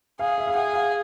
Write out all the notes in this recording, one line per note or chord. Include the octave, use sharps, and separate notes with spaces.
G#4 F5
E5
F5
G#4 F#5
F5